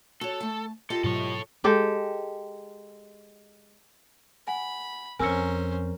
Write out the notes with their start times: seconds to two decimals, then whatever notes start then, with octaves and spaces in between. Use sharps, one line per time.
0.21 F#4 A4 C#5
0.41 A3 A5
0.90 F4 G4 A4 D#5
1.04 G#2 B2 F#3 A4 C#5
1.64 G#3 G4 A4
4.48 F#5 G#5 B5
5.19 F2 C#4 A#4 C5 G#5 E6 C#7